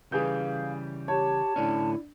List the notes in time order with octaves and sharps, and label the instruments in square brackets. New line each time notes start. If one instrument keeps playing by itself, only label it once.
[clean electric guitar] C#3 E3 G3 [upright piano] G#4 B4 G6 [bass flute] F5
[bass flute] G4 [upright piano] C#5 [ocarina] A5
[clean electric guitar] A2 D3 C#4 [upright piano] D4 [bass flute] E4